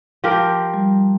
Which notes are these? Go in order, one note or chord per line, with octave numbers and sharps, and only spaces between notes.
F3 G4 A#4
G3